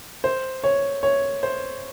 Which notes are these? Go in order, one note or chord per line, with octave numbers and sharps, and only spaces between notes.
C5
C#5
C#5
C5